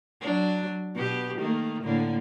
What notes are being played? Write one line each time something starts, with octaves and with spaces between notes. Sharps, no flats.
F#3 D4
B2 B3 G4
D#3 A3 A#3
A2 D3 A#3